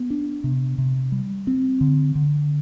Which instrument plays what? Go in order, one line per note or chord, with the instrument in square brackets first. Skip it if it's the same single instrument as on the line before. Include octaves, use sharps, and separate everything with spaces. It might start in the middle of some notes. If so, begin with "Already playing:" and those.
Already playing: [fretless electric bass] B3
D4
C3
C3
G3
C4
D3
D3